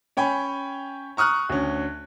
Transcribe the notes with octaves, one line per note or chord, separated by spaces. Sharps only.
C#4 C#5 G5 G#5 B5
A#5 C#6 D#6 F6 F#6
D2 C#4